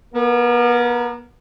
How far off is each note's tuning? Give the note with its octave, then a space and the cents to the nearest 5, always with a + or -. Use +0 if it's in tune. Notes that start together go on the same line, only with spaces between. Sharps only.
B3 -35 A#4 -5